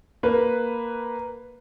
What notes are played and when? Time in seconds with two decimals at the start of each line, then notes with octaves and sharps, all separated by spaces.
0.23 A#3 B4